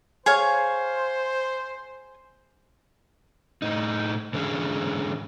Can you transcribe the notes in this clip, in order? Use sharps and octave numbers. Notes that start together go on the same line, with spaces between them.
G#4 C5 C#5 F5
A2 D#4
G#2 D3 E3 C#4 G#4